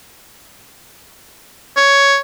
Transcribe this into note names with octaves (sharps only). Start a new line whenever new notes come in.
C#5